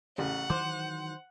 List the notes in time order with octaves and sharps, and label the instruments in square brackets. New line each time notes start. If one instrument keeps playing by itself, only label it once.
[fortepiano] A1 C#3 [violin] F#5
[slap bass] D#3 E3 F#3 [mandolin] C5 [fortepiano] D6